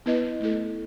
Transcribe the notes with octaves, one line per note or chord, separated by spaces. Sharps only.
B3 E4 B4 D#5
A3 E4 A4